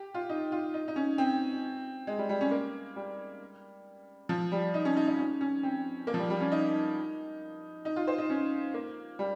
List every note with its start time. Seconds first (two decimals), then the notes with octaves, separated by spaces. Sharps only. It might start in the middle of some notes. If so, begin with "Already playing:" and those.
Already playing: G4
0.14 F4
0.29 D#4
0.52 F4
0.74 D#4
0.88 D#4
0.96 C#4
1.18 C4
2.07 G#3
2.18 G3
2.29 G3
2.41 C#4
2.51 A#3
2.96 G3
4.29 F3
4.52 G3
4.74 D#4
4.85 C#4
4.97 D#4
5.07 D#4
5.18 C#4
5.41 C#4
5.63 C4
6.07 A#3
6.14 F3
6.19 G3
6.30 G3
6.40 C#4
6.52 D#4
7.85 D#4
7.96 F4
8.07 C5
8.18 D#4
8.30 C#4
8.74 A#3
9.19 G3